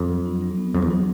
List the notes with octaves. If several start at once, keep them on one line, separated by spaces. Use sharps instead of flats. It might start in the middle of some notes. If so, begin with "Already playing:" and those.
Already playing: F2
F#3
D4
F#3
B3
F2 F#3
E2
D4